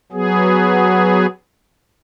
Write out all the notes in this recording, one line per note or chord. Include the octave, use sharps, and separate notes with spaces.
F#3 B3 G#4